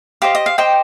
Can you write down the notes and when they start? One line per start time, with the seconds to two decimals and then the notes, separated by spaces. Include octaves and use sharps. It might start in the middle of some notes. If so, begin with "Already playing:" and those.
0.22 G4 C5 D#5 F5
0.35 D#5
0.46 F5
0.58 G4 C5 D#5 G5